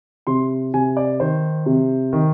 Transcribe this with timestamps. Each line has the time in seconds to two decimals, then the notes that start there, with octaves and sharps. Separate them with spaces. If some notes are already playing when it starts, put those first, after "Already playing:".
0.27 C3 C6
0.74 C3 G#5
0.97 D5
1.20 D#3 C5
1.66 C3
2.13 D#3